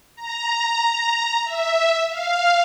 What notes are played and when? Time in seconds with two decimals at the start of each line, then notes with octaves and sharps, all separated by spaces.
0.15 A#5
1.44 E5
2.09 F5